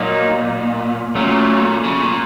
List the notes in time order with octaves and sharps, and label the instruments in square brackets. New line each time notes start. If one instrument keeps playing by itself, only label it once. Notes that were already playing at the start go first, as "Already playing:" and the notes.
Already playing: [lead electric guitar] A#2 [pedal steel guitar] F#3 A#3 D#4
[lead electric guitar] A#2 [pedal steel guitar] F#3 A3 C#4
[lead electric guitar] C#3
A#2